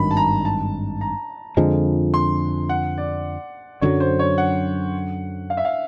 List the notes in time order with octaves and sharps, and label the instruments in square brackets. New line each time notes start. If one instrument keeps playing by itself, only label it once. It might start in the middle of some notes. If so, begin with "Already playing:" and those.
Already playing: [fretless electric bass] G#1 G2 D#3 F#3 [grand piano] B5
[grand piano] A5
A#5
A5
A#5
[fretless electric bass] F2 D3 F3 G#3
[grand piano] C6
F#5
D5
[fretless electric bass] F#2 D3 F#3 [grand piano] C#5
[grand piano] C5
C#5
F#5
F5
E5
F5